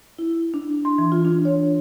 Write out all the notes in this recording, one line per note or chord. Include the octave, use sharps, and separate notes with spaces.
E4
D4
C6
E3
F4
D4
C#5